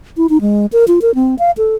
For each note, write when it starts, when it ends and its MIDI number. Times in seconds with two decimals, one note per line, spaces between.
0.17 0.27 64
0.29 0.41 63
0.41 0.66 56
0.73 0.85 70
0.88 1.00 65
1.02 1.15 70
1.15 1.35 60
1.39 1.51 77
1.58 1.75 69